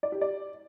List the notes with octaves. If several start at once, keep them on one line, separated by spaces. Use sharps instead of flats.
D5
G4
D5